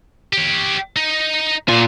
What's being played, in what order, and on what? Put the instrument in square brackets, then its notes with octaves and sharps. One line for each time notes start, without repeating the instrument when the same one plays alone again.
[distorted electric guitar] G4 C#5
D#4
[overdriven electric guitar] A#2 F4 [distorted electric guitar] F#4 G#5